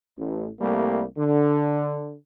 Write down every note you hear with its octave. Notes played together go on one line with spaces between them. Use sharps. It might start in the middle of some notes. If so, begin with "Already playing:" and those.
A1
C2 G3 A3 A#3
D3